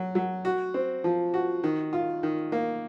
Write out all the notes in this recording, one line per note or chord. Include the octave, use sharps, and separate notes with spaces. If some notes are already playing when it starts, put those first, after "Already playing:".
Already playing: F#3
F#3
F#4
C4
F3
F#4
D#3
F4
D#3
A#3